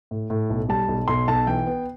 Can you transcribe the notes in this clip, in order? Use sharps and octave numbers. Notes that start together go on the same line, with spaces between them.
A2
A2
B1
G3 A5
B1
B1 C6
B1 A5
E3 G5
B3